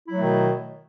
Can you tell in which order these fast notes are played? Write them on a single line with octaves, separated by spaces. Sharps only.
E4 F#3 A3 D#3 B2